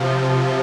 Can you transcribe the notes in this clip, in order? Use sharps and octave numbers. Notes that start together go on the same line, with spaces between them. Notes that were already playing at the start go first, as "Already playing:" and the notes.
Already playing: C3 F3